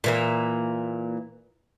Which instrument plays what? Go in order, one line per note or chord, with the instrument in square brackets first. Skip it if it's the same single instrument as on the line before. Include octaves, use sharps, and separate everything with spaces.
[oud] A#2 E3 A#3